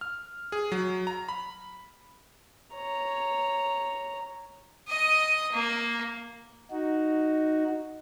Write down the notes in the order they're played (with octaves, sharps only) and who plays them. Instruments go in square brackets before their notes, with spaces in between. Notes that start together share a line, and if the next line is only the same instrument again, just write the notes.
[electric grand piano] F6
G#4
F#3
A#5
B5
[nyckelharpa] C#5 A#5
[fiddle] D#5 D#6
A#3
[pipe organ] D#4 F#4